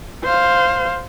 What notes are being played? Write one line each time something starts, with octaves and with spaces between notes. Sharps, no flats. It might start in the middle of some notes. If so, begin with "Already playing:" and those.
C5 F5